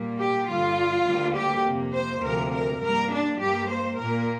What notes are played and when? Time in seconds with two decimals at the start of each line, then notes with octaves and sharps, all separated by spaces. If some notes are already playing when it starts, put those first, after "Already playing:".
Already playing: A#2 G3 A#3
0.19 G4
0.48 G2 D3 G3 F4
1.07 D2 D3 G3 A#3
1.36 G4
1.65 F2 C3 A#3
1.94 C5
2.23 D2 C3 F3 A#3 A#4
2.53 A#4
2.82 G2 G3 A#3 A#4
3.11 D4
3.40 G2 G3 A#3 G4
3.69 C5
3.99 A#2 A#3 A#4